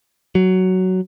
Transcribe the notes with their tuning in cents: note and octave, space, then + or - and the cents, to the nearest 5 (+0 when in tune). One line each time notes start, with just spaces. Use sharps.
F#3 +10